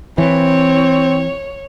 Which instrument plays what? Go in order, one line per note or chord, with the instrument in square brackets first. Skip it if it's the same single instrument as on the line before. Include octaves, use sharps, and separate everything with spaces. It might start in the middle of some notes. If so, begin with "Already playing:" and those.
[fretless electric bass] E3 [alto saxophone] C4 [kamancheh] C#5